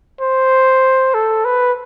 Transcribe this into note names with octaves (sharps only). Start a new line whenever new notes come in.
C5
A4
B4